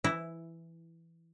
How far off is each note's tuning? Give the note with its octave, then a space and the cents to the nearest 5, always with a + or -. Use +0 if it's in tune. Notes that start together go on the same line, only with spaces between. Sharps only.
E3 +10 E4 +0